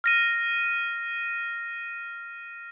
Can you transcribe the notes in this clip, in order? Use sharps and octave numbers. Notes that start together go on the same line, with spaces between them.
F6 A#6 D#7